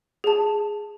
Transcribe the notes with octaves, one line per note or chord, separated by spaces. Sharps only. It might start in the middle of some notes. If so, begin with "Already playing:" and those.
G#4 A5